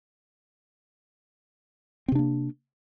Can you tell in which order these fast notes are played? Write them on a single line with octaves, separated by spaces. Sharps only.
C4 C3 D4 A#3